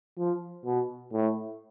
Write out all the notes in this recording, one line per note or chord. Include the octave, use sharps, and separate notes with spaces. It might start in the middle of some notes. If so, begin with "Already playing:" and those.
F3
B2
A2